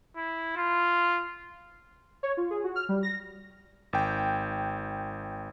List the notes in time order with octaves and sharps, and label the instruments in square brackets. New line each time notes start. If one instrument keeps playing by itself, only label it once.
[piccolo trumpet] E4
F4
[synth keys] C#5
F4
G#4
F#4
F6
G3
A#6
[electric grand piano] G#1 G5